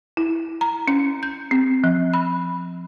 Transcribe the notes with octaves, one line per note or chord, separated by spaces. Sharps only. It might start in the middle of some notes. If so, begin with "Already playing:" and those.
E4
A#5
C#4
G6
C4
F3
B5